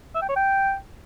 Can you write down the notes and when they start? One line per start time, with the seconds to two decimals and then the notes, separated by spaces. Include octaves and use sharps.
0.15 E5
0.22 G5
0.29 C#5
0.36 G5